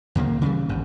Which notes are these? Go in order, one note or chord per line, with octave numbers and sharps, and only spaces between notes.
D2 A#2 C#3 A#3
C#3 E3 G3
G#1 G2